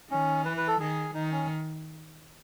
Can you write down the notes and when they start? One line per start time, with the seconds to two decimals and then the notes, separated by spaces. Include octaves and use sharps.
0.10 D#3 C#4
0.45 E3 B4
0.57 B4
0.67 A4
0.80 D#3 G#4
1.14 D#3 D#4
1.31 C#4